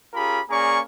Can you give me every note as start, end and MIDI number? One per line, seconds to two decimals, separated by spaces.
0.14 0.40 61
0.14 0.40 65
0.14 0.40 67
0.14 0.40 68
0.14 0.40 70
0.14 0.40 83
0.50 0.81 58
0.50 0.81 61
0.50 0.81 68
0.50 0.81 74
0.50 0.81 82
0.50 0.81 85